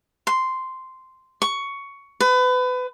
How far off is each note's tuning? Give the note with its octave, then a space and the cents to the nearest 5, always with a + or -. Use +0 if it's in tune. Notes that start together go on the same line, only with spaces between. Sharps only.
C6 -5
C#6 +10
B4 +30